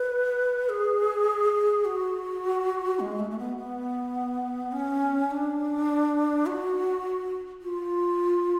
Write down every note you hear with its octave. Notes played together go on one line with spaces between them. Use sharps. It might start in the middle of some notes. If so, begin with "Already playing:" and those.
Already playing: B4
G#4
F#4
G#3
A3
A3
B3
B3
C#4
D4
F#4
F4